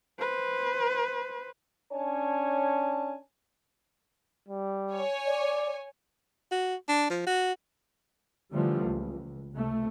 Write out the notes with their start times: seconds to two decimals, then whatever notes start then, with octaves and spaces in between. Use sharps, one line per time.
0.20 B4 C5
1.93 C#4 D4 C#5 G#5 A5
4.48 G3
4.93 C#5 G#5
5.27 D5
6.51 F#4
6.88 D4
7.10 F3
7.26 F#4
8.53 D3 E3 F3 G3 A3
8.86 C#2
9.53 C#2 C3 A3